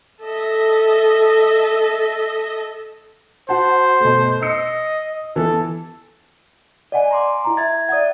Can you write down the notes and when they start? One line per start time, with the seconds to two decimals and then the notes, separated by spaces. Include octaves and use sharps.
0.23 A4 D#5 E5
3.49 F#4 C5 F#5 A5
4.00 B2 A3
4.42 D#5 E6 C7 C#7
5.36 E3 B3 A4
6.92 D5 D#5 F#5 G#5
7.11 A#5 C6 D6
7.45 E4 A#5
7.57 E5 G#6 A6
7.89 D5 E5 F#5 D#6 G#6